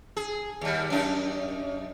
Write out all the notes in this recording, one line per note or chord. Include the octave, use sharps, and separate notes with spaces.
G#4
D#2 G3
F#2 D4 D#4